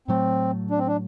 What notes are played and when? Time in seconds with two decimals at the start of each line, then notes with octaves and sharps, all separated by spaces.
0.08 A2 F#3 A3 C4
0.70 D4
0.79 C4
0.87 D4